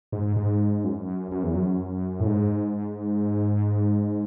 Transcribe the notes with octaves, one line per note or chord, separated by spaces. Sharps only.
G#2
G#2
F#2
F#2
E2
F#2
A2
G#2